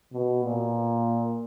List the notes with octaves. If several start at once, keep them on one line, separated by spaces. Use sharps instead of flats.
B2
A#2